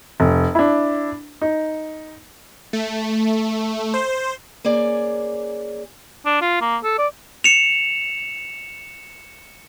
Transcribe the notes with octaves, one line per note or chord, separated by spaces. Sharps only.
F1
D4 E4
D#4
A3
C5
A#3 C#4 G#4 D5
D4
F4
A#3
A4
D5
C#7 E7 F7